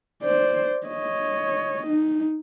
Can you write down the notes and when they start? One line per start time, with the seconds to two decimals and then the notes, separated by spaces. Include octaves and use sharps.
0.23 C5 D5
0.87 C#5 D#5
1.88 D#4